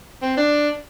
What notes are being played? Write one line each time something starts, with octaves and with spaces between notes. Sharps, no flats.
C4
D4